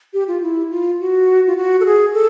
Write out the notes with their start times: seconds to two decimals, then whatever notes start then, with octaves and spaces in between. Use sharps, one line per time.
0.14 G4
0.28 F4
0.42 E4
0.71 F4
1.00 F#4
1.47 F4
1.57 F#4
1.80 A4
1.86 G#4
2.14 A4